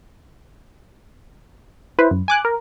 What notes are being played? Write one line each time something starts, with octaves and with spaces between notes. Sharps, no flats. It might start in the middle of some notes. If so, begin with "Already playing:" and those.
E4 B4 C5
F#2
G#5 D6 F#6
A#4